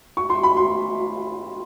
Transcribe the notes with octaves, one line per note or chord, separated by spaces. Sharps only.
C#6
C6
B5
C6